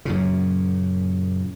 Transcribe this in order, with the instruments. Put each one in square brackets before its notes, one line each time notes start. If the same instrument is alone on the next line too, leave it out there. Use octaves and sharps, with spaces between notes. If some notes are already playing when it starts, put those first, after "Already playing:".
[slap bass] F#2 A#2 C#3